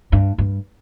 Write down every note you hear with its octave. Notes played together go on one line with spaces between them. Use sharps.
G2
G2